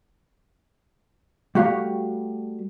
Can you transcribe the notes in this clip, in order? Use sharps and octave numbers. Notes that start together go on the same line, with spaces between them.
G3 A3 F#4 G4 F5